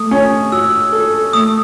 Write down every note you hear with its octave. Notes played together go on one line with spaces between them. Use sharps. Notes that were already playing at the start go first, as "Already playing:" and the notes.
Already playing: A3 D#6
C#4
F#4 E6
A4
A3 D#6